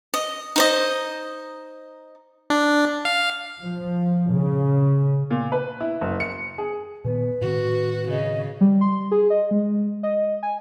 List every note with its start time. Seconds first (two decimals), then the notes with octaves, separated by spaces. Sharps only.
0.14 D#5
0.56 D#4 C5 D#5
2.50 D4
3.05 F5
3.61 F3
4.31 C#3
5.31 A#2
5.52 B4
5.81 E4
6.01 F#1
6.20 C#7
6.58 G#4
7.05 A#2 D#3 B3 B4
7.41 A2 D#3 C4 F#4
8.09 C#3 D#5
8.61 G3
8.81 C6
9.11 G#4
9.30 D#5
9.51 G#3
10.03 D#5
10.43 G#5